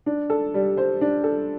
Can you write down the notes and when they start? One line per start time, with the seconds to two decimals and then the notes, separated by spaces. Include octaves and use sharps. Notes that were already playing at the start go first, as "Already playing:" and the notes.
0.06 D4
0.30 A4
0.54 G3
0.77 C5
1.01 D4
1.24 A4